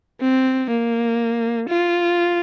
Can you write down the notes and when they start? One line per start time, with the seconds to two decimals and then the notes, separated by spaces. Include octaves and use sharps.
0.21 C4
0.70 A#3
1.69 F4